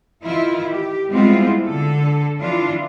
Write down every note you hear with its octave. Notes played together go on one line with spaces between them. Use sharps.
D#3 E3 E4 F4
G4
G3 G#3 B3 C4 E4 F4
D3 A4
E3 D4 F4